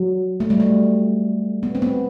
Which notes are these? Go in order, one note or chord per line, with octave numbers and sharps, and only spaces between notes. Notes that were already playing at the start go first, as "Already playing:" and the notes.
Already playing: F#3
A3
G3
A3
B3
C4
B3